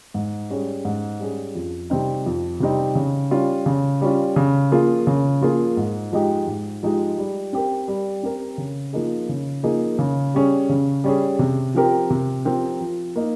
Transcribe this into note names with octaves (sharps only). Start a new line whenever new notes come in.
G#2
G3 C#4 G#4
G#2
G3 C#4 G#4
F2
C3 G3 C4 D#4
F2
C3 G3 C4 D#4
C#3
G3 C#4 F4
C#3
G3 C#4 F4
C#3
F3 A#3 F4 G#4
C#3
F3 A#3 F4 G#4
G#2
F3 G#3 D#4 G4
G#2
F3 G#3 D#4 G4
G3
C4 G4 A#4
G3
C4 G4 A#4
C#3
F3 A#3 D#4 G#4
C#3
F3 A#3 D#4 G#4
C#3
G3 C#4 G#4
C#3
G3 C#4 G#4
C3
F3 C4 G4 A#4
C3
F3 C4 G4 A#4
F3
A#3 D#4